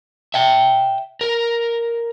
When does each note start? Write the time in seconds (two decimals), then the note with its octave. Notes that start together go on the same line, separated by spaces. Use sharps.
0.34 E5 G5
1.21 A#4